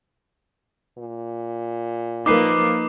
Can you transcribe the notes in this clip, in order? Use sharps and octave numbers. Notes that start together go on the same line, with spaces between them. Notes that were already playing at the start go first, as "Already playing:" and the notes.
A#2
F3 A#3 D#4 B4 D6 C7